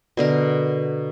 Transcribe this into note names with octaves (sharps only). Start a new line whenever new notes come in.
B2 D3 A#4